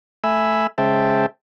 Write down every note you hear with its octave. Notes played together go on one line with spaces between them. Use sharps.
A3 E5 G#5 B5 E6
C#3 G#3 C5 E5 G5 A5